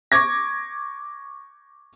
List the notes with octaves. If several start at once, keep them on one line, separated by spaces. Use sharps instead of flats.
C#6 D6 G#6 A#6